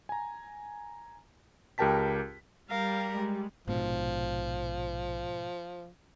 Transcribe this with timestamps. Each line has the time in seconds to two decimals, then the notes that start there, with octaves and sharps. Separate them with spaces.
0.09 G#5 A#5
1.78 C#2 G4 A#4 G5 A5 B6
2.70 G3 A#4 F5
3.10 G#3
3.67 A#1 G#2 B2 F3